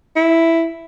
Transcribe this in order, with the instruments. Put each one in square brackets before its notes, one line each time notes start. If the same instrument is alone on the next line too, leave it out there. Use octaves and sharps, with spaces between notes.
[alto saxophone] E4